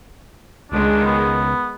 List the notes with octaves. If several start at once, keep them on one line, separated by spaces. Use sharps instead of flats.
C#2 D#3 G#3 D4
B3